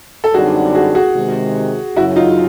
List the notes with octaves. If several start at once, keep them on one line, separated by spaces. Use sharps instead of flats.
A4
F#2 D3 G3 C4 D#4 F#4 G#4
F#4 G#4
F#4 G#4
C3 D#3 G#3
F#2 C#3 F#3 E4 F#4
D#4 F4